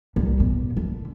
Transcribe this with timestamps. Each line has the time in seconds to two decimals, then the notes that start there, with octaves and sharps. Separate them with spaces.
0.16 C2
0.40 B2
0.77 D3